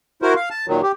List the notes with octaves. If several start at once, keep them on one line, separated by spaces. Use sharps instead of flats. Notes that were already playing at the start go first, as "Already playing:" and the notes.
E4 F#4 A#4 C5
F5
A5
A#2 D#3 F#3
G4